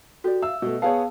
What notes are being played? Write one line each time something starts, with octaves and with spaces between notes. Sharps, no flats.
F#4 G4 A4 D5
E5 F5 E6
B2 A3 D#5
B3 G#4 C#5 F5 G5 A5